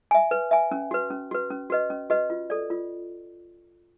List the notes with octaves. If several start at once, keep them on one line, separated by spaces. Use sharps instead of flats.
E5 G#5
B4
E5 G#5
C#4
F#4 B4
C#4
F#4 B4
C#4
F#4 B4 D#5
C#4
F#4 B4 D#5
F4
A4 D5
F4